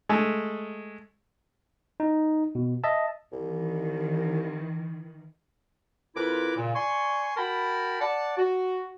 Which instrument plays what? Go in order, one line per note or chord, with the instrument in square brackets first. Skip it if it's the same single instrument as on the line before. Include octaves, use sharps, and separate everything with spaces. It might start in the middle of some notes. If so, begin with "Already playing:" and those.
[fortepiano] G#3 A3
[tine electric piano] D#4
B2
D#5 E5 A5
[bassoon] C2 [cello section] D#3 E3
[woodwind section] F2 E4 F4 A#4 B4 D6
A#2 C#3
D5 G#5 C6 C#6
F#4 A#4 G5 A5 B5
D5 F#5 A5
F#4